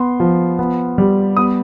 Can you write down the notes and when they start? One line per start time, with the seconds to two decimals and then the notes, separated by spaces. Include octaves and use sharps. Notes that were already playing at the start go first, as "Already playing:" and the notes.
Already playing: B3 C6
0.20 F3
0.59 B3
0.98 G3
1.37 B3 D#6